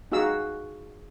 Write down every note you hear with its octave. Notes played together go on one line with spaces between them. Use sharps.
D#4 F#4 G#4 F5 E6